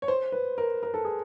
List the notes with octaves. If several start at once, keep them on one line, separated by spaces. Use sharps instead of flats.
C#5
C5
B4
A#4
A#4
A4
G#4